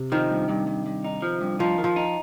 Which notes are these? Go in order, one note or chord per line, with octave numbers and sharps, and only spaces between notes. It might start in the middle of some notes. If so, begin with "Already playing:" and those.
Already playing: C3
D#3 F3
G2
G2
G2
G2
D#4
F3
G2
F3 D#4
D#3
F3
D#4